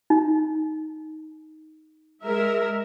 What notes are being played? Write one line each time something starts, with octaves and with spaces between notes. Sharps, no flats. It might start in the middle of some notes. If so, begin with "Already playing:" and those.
D#4
G#3 A#4 E5